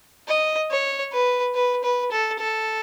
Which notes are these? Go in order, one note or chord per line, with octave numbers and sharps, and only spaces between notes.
D#5
C#5
B4
B4
B4
A4
A4